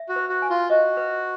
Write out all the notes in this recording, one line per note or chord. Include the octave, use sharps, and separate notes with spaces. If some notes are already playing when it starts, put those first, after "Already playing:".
Already playing: E5
F#4
B4
F#4
G#5
F4
F#4 D#5
B4